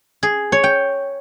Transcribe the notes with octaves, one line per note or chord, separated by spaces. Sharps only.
G#4
C#5
G5